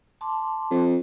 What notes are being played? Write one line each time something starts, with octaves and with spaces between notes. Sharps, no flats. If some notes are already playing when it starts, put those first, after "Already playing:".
A5 C6 D6
F2